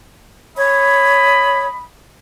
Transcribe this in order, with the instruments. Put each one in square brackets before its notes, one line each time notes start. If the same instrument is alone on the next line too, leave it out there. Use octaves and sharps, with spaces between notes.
[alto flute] C#5 [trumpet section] D#5 B5